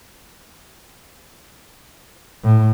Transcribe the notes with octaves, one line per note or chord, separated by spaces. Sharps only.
A2